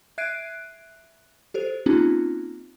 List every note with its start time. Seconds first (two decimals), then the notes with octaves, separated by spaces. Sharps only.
0.18 E5 F#6 G#6 C7 D7 D#7
1.54 G4 A4 C5
1.86 A#3 C4 C#4 D#4 F4 G4